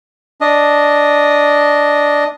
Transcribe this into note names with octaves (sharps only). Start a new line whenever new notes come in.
D4 D#5